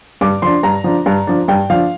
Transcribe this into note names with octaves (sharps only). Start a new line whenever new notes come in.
G2 D6
F3 D4 C6
G2 A#5
F3 D4
G2
F3 D4
G2 G5
F3 D4 F5